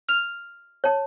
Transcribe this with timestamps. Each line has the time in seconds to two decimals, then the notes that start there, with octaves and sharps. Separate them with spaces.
0.09 F6 F7
0.84 C#5 A5